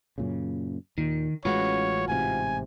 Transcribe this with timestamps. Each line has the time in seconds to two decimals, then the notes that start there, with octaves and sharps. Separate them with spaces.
0.18 F#2 A#2 C#3
0.98 D#2 A#2 D#3
1.45 A1 G#3 C#4 F4 F#4 B4 C#5
2.08 A1 G#2 C3 G#5